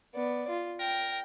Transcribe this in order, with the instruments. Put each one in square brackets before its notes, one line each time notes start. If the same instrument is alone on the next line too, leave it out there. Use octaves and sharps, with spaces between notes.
[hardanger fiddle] B3 D5
F4
[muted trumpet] A#4 [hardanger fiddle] G5